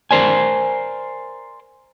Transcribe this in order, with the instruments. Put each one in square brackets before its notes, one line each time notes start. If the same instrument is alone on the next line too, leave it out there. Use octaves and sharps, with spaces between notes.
[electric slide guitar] A#4 C5 D5 G#5